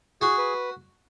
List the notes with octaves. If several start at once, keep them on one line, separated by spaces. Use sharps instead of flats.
F#4 G#4
B4